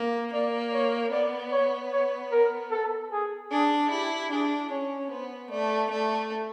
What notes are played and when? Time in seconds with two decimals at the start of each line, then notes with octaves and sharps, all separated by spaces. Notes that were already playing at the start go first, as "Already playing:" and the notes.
Already playing: A#3
0.33 A#3 D5
0.73 C#5
1.12 B3 D5
1.52 C#5
1.92 C#5
2.32 A#4
2.71 A4
3.12 G#4
3.51 D4 G#4
3.91 E4 G4
4.31 D4 G#4
4.71 C#4 C#5
5.10 B3 C5
5.51 A3 D5
5.91 A3